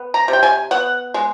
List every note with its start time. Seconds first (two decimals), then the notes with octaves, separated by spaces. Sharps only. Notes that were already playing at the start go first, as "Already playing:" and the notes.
Already playing: B3
0.14 A#5
0.28 C3
0.33 G5
0.43 G#5
0.71 B3 F#5
1.14 G#3